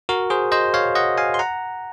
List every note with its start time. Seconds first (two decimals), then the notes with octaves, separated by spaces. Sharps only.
0.09 F#4 A#4
0.30 G#4 C5
0.52 C5 D#5
0.74 C#5 F5
0.95 D#5 F#5
1.18 F5 G#5
1.34 C6
1.39 F#5 A#5